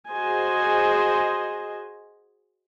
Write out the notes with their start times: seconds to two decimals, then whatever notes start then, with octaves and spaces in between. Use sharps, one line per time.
0.10 F#4 G#4 C5 D#5 G#5